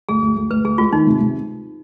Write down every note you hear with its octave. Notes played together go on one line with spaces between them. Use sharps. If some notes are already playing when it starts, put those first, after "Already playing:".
D2 G#4
D2
D2
D2 B4
D2 G#4
G#3 F4
D#3 D#4
C3
C3